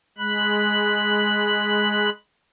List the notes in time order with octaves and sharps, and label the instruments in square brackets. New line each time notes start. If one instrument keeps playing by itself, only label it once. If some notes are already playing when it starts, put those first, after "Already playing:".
[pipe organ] G#3 B5 F#6